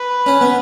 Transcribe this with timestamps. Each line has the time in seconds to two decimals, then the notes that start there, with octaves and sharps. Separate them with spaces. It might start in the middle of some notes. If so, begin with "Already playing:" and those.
Already playing: B4
0.26 C#4
0.41 B3